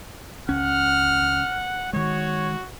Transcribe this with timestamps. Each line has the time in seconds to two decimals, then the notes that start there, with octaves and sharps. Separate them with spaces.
0.49 C#2 C#4 F#5 F6
1.93 D#3 G#3 F#4 C#5